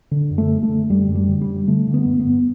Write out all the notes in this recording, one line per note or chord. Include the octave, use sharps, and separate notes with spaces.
D3
F#2
A3
D3
A3
D3
F#2 G3
F#2
G3
D3
G3
D3
D3 A3
D3
B3
G2
B3
G2